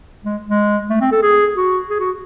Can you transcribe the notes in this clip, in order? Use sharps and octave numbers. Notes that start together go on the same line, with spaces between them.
G#3
G#3
A3
C4
A4
G#4
F#4
G#4
F#4